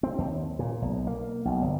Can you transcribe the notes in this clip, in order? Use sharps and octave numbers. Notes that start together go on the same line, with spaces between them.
C4
D#2
A#2
B1
A#3
B1
G1